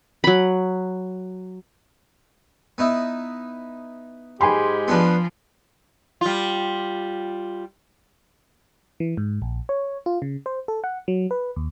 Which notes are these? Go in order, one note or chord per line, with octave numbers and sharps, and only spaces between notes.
F#3 B5
B3 D#4 E4
G#2 G#3 G4 G#5 B5 C6
F3 B3 D4 B4
G3 F4
E3
G#2
A#1
C#5
F4
C#3
C5
A4
F#5
F#3
B4
D#2